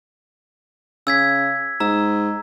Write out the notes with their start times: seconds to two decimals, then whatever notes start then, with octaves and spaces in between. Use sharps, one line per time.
1.07 C#3 E6 G#6 B6
1.80 G#2 A#5 E6